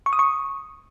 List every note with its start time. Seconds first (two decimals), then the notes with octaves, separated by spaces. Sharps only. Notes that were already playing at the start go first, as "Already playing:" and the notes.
0.06 C#6
0.13 D#6
0.19 C#6